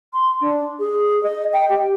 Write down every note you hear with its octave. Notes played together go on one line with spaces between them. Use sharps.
C6
D4
G#4
D#5
G5
G4